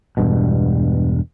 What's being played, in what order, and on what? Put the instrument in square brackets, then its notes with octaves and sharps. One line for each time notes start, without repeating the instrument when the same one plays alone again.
[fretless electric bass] E1 G2 B2